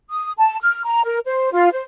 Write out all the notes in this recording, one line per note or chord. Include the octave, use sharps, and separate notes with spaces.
D#6
A5
F6
A#5
A#4
C5
F4
C5